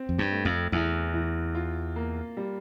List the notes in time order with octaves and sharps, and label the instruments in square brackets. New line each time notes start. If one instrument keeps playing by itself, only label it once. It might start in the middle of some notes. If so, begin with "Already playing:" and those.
Already playing: [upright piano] C4
[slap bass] F2
G2
[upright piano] A3
[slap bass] F2
[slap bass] E2 [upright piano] E3
[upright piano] E3
F4
A#3
G3